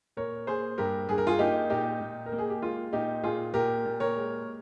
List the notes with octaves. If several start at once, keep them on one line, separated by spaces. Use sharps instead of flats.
A#2 A#4 C#5
A#3 G#4 C5
G2 G4 A#4
G2 G#4
A#4
F4 G#4
A#3 D#4 G4
A#2 D#4 G4
A#2
A#4
A#3
G#4
G4
G#3 F4
A#2 D#4 G4
A#2 F4 G#4
A#2 G4 A#4
A#2
A#4 C#5
G#3